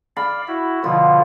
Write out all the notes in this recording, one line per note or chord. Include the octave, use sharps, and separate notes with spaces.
D5 F5 B5
E4 F#4
B2 D3 F3 F4